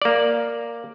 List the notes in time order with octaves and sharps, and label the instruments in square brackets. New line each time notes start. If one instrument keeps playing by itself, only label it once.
[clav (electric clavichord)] A#3 D5